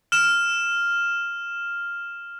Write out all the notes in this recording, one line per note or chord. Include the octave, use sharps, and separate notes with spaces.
F6 E7